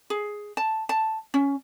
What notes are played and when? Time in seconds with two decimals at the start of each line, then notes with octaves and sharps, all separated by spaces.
0.10 G#4
0.57 A5
0.89 A5
1.34 C#4